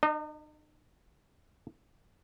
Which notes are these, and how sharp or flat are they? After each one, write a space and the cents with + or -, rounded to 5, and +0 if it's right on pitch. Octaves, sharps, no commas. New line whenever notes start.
D#4 -45 D#5 +0